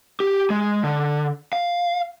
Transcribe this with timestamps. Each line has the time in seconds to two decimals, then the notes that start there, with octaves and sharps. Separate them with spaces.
0.20 G4
0.50 G#3
0.84 D3
1.53 F5